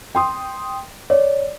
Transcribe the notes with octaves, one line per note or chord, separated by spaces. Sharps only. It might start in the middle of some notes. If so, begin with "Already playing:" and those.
G5 C6 D#6
C#5 D5